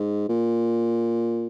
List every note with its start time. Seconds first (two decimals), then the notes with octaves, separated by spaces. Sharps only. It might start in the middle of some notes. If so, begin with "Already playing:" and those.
Already playing: G#2
0.29 A#2